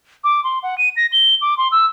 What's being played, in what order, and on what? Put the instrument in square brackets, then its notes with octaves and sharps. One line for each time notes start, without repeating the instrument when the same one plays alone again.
[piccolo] D6
C6
F#5
D#7
A#6
G7
D6
C6
E6